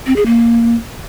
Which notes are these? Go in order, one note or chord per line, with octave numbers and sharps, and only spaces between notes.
C4
G#4
A#3